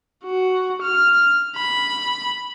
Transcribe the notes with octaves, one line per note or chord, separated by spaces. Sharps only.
F#4
F6
B5